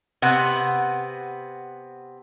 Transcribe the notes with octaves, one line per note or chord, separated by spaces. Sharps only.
C3 B3 F#5